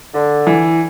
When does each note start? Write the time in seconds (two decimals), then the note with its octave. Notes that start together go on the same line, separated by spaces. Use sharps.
0.14 D3
0.47 E3